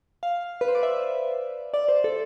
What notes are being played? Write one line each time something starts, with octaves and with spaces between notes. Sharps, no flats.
F5
B4
C5
D5
E5
D5
C5
A4